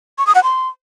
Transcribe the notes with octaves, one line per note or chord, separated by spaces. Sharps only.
C#6
D#6
F#5
C6